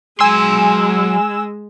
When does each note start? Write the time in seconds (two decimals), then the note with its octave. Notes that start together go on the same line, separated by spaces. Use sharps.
0.20 F#3 G#3 G#5 C6 E6 E7